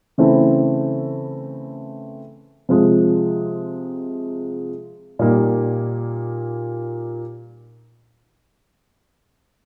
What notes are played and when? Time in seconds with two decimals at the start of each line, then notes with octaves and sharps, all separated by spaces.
0.18 C#3 E3 A3 C4 E4
2.69 C3 F3 G#3
5.19 A#2 G3 A#3 D#4